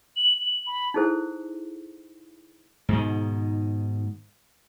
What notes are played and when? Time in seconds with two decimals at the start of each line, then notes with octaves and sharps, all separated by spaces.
0.16 F#7
0.41 F#7
0.67 B5
0.94 D#4 E4 G#4 A4 C5
2.89 G#2 B2 D#3